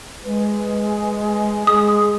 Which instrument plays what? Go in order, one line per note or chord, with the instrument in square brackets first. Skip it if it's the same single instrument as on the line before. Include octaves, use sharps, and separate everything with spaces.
[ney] G#3 [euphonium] B4
[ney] G#3 [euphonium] G#4 [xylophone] D#6